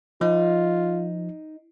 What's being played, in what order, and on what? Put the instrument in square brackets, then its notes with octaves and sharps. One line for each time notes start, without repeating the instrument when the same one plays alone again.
[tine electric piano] F3 [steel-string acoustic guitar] D#4 [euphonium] F4